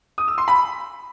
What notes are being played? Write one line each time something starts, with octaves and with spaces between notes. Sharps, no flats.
D#6
E6
C6
B5